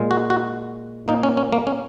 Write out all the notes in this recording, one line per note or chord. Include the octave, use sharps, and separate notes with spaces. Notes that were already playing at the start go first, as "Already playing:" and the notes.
Already playing: A#2 G#3
F#4
F#4
A#2 A#3 D#4
C#4
C#4
A#3
C#4